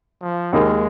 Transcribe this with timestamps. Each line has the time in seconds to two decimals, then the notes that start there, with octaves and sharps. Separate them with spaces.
0.22 F3
0.53 D#2 D#3 G#3 A#3 D#4 G#4